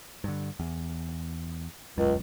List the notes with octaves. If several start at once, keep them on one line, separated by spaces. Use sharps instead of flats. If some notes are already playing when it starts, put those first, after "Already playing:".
G2 D3
E2
E1 C#2 F#2